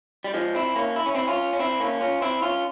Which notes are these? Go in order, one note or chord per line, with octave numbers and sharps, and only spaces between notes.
G3
F3 G#3
C4 E4
A#3 C#4
E4
C#4
C4 E4
C#4 F4
C#4
C4 E4
A#3 C#4
C#4 F4
C4 E4
C#4 F4